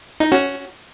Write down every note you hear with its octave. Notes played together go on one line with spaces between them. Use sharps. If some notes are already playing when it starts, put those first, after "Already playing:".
D#4
C#4 F#4